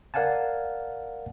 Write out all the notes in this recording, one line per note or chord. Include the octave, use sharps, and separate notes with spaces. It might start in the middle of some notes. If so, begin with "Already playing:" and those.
A#4 D5 F5 F#5 G#5 A5